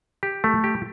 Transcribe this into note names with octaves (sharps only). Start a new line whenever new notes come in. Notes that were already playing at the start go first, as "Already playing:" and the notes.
G4
A3
G4